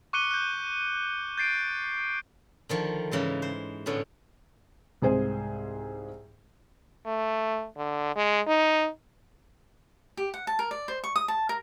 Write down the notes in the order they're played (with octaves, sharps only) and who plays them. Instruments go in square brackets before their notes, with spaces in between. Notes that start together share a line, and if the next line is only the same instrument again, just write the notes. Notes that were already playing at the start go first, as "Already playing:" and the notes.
[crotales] C#6 D6 F#6 C#7 D#7 G7
F#6 G6
G6 A6 C7 D7
[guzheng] D3 D#3 F3
G#2 C#3 E3 G#3
C5
A2 D3 G#3 B3 C#4
[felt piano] C2 G#2 G#4 C5 G#5
[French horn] A3
D3
G#3
D#4
[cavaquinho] G4
F#5
A5
A#4
D5
C5
C#6
D#6
A5
A#4